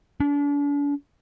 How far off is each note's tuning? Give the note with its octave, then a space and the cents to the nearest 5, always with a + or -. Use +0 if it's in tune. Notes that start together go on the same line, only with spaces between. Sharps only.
D4 -40